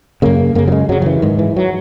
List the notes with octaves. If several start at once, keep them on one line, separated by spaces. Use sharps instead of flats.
F#2 C#3 A#3
F#2 C#3 A#3
F#3
G#3
F#2 C#3 F#3
F#3
E3
G#2 D#3
E3
F#3